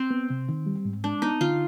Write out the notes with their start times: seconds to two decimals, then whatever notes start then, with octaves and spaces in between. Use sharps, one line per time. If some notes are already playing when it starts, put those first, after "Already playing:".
Already playing: C4
0.10 B3
0.30 C3
0.49 D#3
0.66 G3
0.85 G#2
1.04 G#3 D4
1.22 B3 D#4
1.41 D3 F4